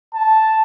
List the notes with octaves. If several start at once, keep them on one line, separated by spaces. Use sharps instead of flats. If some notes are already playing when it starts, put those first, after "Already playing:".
A5